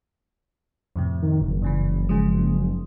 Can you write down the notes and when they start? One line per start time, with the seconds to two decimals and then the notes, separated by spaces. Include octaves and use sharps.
0.96 F2 A2 C3
1.22 D#3
1.42 F#1
1.62 G2 C#3 E3
2.09 C#3 F3 G#3